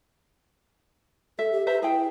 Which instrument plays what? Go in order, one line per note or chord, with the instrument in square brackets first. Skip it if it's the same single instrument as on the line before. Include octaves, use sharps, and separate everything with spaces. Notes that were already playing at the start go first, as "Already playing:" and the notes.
[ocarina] A4 [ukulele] E5
[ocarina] G4
[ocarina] B4 [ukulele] C5 E5 A#5
[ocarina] E4 [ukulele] G#4 G5